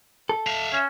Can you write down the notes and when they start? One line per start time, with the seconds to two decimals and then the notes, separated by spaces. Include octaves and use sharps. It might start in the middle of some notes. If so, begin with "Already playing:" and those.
0.29 A4
0.47 E5 F5
0.72 C#4